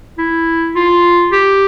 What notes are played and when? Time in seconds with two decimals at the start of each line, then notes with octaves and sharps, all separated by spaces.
0.18 E4
0.75 F4
1.32 G4